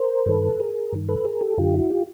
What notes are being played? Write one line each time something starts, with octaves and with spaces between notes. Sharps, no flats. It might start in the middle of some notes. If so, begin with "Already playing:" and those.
Already playing: A#4 C5
G2 D#3 A4 B4
G#4 A#4
G2 D#3
A4 B4
G#4 A#4
G4 A4
F#2 D3 F4 G4
E4 F#4
F4 G4